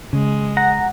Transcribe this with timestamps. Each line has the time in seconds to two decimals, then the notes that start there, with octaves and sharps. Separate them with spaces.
0.13 C#3 G#3
0.57 F#5 A#5